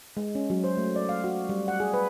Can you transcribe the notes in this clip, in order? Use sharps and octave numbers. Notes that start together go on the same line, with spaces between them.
G#3
C#4
F#3
C5
A3
D5
F5
F#4
G3
F#5
G#4
B4